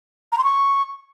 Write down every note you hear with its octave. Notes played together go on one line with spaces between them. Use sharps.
A#5
C6
C#6